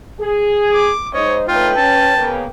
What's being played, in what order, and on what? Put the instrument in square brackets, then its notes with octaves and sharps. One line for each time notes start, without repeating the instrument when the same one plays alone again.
[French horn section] G#4
[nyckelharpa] D6
[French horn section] G#2 D#4 C5 [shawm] C#5 [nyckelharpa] D#5
[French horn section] A3 C#4 D#4 [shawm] F4 [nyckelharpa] B4 G5
[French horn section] C#4 [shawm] A5
[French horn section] C#3 A#3 B3